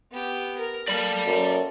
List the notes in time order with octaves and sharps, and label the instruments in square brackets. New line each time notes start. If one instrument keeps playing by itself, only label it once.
[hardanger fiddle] B3 G4
A#4
[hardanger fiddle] A#3 A4 [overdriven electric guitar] D5 B5
[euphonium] F#2